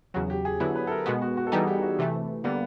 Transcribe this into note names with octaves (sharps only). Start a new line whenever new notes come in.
E2 C#3 F#3 F#4
G4
G#4
D3 F#3 B3 E4
B4
A4
A#4
B2 G#3 B3 F#4
F#4
F#4
A4
E3 G3 B3 D#4 G#4
G4
F#4
C3 E3 A3
D3 G3 A#3 B3